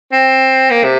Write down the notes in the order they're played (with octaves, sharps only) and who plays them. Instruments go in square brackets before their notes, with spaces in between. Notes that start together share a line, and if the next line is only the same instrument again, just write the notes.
[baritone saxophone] C4
A#3
C3